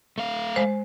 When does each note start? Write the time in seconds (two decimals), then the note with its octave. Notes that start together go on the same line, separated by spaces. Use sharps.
0.18 A3 F5
0.56 G#3 C5